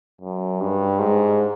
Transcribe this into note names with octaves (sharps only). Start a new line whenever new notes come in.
F#2
G2
G#2